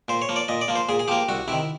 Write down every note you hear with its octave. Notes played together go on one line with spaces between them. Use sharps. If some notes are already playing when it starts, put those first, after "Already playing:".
A#2 C5
C#5
F3 A#3
D5
A#2 D#5
D5
F3 A#3
C5
A#2 G#4
G#4
F3 A#3 G4
C2 F#4
C3 D#3 E4